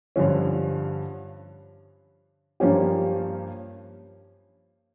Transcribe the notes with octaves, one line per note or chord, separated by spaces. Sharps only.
G2 D3 F3 C#4
G2 F3 A#3 C#4 G4